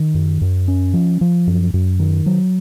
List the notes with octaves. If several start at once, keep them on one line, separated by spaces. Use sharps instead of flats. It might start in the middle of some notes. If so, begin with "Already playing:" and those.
Already playing: D#3
F#2
F#2
C#4
F3
F3
F#2
F#2
D#3
F#3